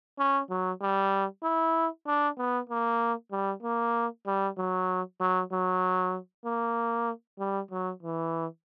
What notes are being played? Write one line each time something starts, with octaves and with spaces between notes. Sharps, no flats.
C#4
F#3
G3
E4
D4
B3
A#3
G3
A#3
G3
F#3
F#3
F#3
A#3
G3
F#3
E3